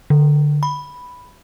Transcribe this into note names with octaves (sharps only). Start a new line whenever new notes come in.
D3
B5